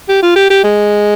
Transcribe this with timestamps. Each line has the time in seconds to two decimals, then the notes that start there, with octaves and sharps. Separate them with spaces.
0.09 G4
0.22 F4
0.36 G4
0.50 G4
0.64 G#3